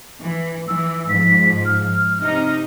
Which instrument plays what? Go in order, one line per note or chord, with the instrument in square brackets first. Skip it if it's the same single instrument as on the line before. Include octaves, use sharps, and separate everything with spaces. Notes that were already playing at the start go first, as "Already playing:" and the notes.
[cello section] E3
[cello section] E3 [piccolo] E6
[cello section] G#2 F3 [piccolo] B6
[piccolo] F6
[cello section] C3 D#4